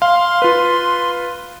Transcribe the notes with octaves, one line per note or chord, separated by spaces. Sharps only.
F5 C6
F4 B4